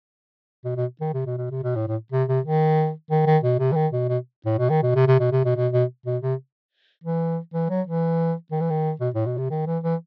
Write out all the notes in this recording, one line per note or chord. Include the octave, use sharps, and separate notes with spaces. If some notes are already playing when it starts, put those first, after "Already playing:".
B2
B2
D#3
C3
B2
B2
C3
B2
A2
A2
C3
C3
D#3
D#3
D#3
B2
C3
E3
D#3
B2
B2
A2
B2
D#3
B2
C3
C3
B2
C3
B2
B2
B2
B2
C3
E3
E3
F#3
E3
D#3
E3
D#3
B2
A2
B2
C3
D#3
E3
E3